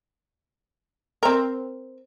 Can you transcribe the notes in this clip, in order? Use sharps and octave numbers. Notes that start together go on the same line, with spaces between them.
C4 A#4